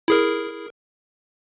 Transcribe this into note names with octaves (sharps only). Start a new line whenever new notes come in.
E4 G#4 A#4